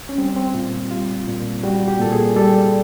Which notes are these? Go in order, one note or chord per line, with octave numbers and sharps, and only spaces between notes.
C#4
G3 C4
C4
A#2 F4
G3 F4
A#2
G3 F#4
G4
A#2 A4
G#4
G3 A4